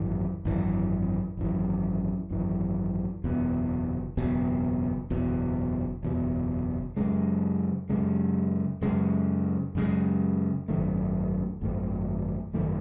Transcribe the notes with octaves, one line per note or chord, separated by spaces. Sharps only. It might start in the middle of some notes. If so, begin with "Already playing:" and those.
Already playing: G#1 F#2 E3
G#1 F#2 E3
G#1 F#2 E3
G#1 F#2 E3
F#1 E2 B2
F#1 E2 B2
F#1 E2 B2
F#1 E2 B2
F#2 C#3 G#3
F#2 C#3 G#3
F#2 C#3 G#3
F#2 C#3 G#3
G#1 F#2 D#3 A3
G#1 F#2 D#3 A3
G#1 F#2 D#3 A3